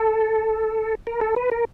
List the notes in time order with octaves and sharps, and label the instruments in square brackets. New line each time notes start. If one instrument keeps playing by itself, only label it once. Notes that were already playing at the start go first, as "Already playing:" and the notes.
Already playing: [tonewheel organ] A4
A#4
A4
B4
A#4